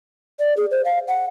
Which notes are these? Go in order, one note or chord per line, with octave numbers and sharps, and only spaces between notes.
D5
G#4
C5
F5
F#5